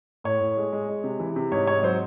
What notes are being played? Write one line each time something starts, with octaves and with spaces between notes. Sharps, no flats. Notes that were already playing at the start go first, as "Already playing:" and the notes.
A2 C#5
A2
G#3
G#3
G#3
C3
E3
C3
G#2 C#5
G#2 C#5
F#3 C5